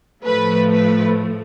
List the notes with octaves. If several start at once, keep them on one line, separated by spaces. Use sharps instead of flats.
A2 F3 A3 B4
B4